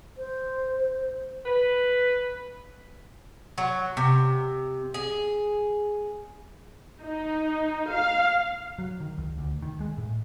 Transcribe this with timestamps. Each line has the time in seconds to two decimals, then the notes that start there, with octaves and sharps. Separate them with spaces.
0.18 C5
1.46 B4
3.58 F#3
3.97 C3
4.94 G#4
7.01 D#4
7.90 F5
8.79 F#3
9.00 D#3
9.18 C#2
9.38 D2
9.62 D#3
9.81 G#3
9.98 A2